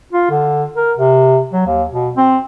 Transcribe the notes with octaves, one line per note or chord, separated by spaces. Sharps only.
F4
D3
A#4
C3
F#3
D#2
B2
C4